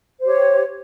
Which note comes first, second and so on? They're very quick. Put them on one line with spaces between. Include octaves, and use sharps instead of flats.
C5 G4 C#5